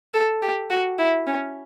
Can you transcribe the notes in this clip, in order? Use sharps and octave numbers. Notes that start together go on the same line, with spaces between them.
A4
G4
F#4
E4
C#4